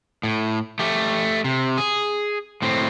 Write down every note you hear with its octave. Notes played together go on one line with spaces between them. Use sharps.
A2
A3 G4
C3
G#4
A2 C4